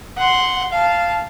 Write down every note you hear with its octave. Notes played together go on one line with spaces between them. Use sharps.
F#5 C6
F5 A5